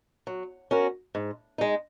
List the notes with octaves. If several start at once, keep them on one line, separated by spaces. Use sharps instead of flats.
F#3
C#4 F#4 A#4
G#2
G#3 D#4